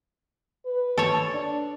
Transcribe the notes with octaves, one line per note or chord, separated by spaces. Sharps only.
B4
A4 C#5
D4